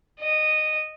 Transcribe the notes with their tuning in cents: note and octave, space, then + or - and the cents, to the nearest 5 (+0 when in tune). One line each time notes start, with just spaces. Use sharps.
D#5 -15